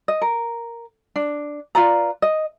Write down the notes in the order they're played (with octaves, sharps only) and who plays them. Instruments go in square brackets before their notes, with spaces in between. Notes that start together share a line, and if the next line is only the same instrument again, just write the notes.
[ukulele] D#5
A#4
D4
F4 B4 D5 A#5
D#5